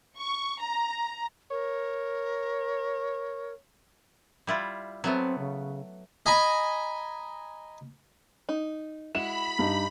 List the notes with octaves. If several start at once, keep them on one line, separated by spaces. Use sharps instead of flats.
C#6
A#5
A#4 C#5
G3 E4 F4
F#3 A3 B3 C4
C#3
D#5 G#5 A#5 B5
D#4
G#3 E4 F#4 B5 E7
G2 D#4